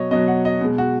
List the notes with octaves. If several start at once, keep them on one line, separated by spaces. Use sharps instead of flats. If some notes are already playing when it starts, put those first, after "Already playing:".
Already playing: B2 F#3 C#5 D#5
B2 F#3 D#5
F#5
D#5
B2 G#3
F#4